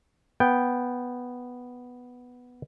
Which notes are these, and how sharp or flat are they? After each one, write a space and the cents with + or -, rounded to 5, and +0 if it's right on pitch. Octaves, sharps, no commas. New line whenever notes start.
B3 +0 G5 +0